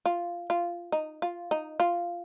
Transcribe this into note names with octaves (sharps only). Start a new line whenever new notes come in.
F4
F4
D#4
F4
D#4
F4